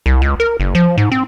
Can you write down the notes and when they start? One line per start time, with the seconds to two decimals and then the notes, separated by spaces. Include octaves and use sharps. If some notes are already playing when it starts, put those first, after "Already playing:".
0.06 C2
0.22 C#2
0.40 A#4
0.60 F#1
0.75 F3
0.98 G#2
1.12 C4